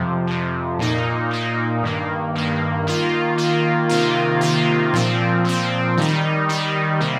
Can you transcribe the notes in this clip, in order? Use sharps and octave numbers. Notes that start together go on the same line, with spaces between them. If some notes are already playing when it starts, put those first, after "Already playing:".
Already playing: F2 C3 F3
F2 C3 F3
A#2 A#3 D#4
A#2 A#3 D#4
G2 D#3 A#3
G2 D#3 A#3
D#3 A#3 F4
D#3 A#3 F4
C3 D#3 A#3 F4
C3 D#3 A#3 F4
A#2 F3 C4
A#2 F3 C4
D#3 G3 D#4
D#3 G3 D#4
C3 G3 A#3